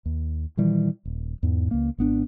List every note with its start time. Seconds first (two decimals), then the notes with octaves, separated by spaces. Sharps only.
0.05 D#2
0.57 A#2 D#3 E3 G3
1.05 D#1
1.43 E2 G#2
1.71 C#2 A#3
1.98 G#1 B3 D4